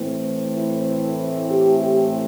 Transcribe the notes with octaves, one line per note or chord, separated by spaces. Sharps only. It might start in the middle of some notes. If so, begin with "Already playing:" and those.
Already playing: A2 E3 A3 C4
E4
G4
G4